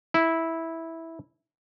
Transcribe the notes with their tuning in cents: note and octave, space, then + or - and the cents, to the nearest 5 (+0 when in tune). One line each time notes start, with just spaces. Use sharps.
E4 -10